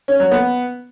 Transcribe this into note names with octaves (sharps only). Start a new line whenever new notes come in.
C#4
F#3
B3